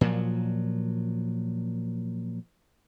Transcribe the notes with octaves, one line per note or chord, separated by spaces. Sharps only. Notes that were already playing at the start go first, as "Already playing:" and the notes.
A#2 F3 F#3